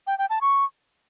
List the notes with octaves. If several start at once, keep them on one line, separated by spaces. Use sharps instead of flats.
G5
G5
A5
C#6